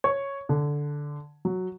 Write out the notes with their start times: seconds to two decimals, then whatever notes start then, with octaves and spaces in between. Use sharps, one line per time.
0.04 C#5
0.49 D3
1.45 F#3